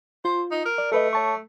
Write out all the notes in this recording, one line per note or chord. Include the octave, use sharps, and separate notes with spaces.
F4 C5
D#4
A#4
D5
A3 A4 B4 D#5
C#5 A5 C#6